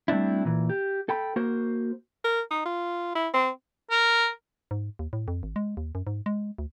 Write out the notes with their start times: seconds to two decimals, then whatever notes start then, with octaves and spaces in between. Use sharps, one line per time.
0.08 G3 A3 C4 D4 E4
0.45 A#2 E3
0.69 G4
1.09 A4 G5 B5
1.36 A#3 F#4 A#4 C5
2.25 A#4
2.51 D#4
2.65 F4
3.15 E4
3.34 C4
3.91 A#4
4.71 G#2
4.99 D#2
5.13 A2
5.28 F2
5.43 G#1
5.56 G#3
5.77 D#2
5.95 F#2
6.07 G#2
6.26 G#3
6.58 D2